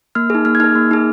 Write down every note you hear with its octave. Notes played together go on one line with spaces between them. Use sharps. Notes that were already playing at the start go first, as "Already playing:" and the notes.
A#3 F6
D#4 G#4
A#3 F6
G#6
D#4 G#4 F6
A#3
D#4 G#4